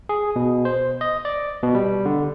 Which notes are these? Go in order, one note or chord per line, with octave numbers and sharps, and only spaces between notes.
G#4
B2
C5
D#5
D5
B2
G3
D3